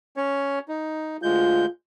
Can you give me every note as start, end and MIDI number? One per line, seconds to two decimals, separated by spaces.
0.17 0.59 61
0.17 0.59 73
0.68 1.17 63
1.23 1.66 38
1.23 1.66 56
1.23 1.67 65
1.23 1.66 91